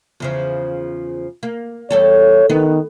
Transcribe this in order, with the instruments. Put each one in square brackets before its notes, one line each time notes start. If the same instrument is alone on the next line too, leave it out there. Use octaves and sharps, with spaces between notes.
[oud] E2 C#3 F3
A#3
[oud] E2 G3 A4 [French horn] C#5
[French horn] D#3 [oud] B3